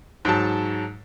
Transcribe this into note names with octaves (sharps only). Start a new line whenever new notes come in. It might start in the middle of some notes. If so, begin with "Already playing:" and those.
G#2 F#3 A5